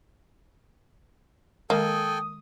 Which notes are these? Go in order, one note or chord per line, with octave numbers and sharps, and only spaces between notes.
D#3 G#3 A#3 A4 G5 G#5 D#6